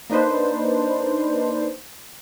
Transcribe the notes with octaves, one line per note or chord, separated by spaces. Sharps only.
A#3 D4 D#4 B4 C5